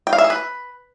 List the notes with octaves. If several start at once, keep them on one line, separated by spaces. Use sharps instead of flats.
G5
F5
E5
G#4
B4